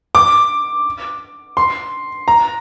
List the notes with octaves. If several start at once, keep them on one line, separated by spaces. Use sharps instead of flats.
D6
C6
A#5